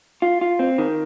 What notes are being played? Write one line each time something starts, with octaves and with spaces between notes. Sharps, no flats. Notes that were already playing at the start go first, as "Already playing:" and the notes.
F4
F4
C4
D#3